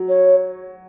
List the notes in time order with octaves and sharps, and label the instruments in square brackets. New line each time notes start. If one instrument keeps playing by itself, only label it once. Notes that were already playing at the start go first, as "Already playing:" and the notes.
Already playing: [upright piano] F#3
[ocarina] C#5